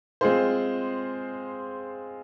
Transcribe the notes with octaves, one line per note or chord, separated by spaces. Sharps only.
G#3 C4 F4 G#4 C5